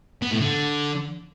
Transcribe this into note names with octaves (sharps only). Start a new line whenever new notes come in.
B3
A2
D3